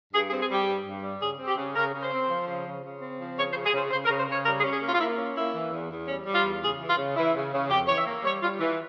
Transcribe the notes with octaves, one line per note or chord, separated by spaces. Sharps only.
G2 G#4
G#4
C4
G#4
G3 G4
G2
G2
G3
C#3 G#4
C4
G4
C#3
C#3 A#4
C#3
C5
C4
F3
C#3
C#3
C#3
C4
F3
C#3 C#5
C5
C#3
G#4
C#3 C5
C#3 C5
A#4
C#3
C5
C#3 C#5
G3 A#4
G#4
C#4
G#4
A#3 F4
F4
A#3 E4
C#4
A#3 E4
E3
E2
E2
G3 C#4
G3
F4
E2
C#3 G#4
E3
F4
C#3
E3 E4
C#3
C#3
F2 G4
E3 C#5
E5
A#3
G3 C#5
G3 F4
E3